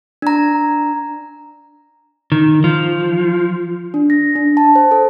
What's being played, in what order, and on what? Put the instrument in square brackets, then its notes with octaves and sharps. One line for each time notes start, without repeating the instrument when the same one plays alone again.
[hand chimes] D4 A#5
[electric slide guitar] D#3
F3
[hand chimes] D4
A#6
D4
A5
C5
A4